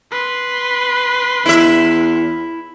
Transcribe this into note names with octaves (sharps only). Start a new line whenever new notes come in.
B4 C6
E2 E4 E5